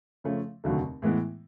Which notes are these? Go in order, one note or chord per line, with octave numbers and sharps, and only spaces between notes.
C#3 F3 A3 C#4
F1 D#2 D3 F#3 A3
A2 E3 G#3 B3 E4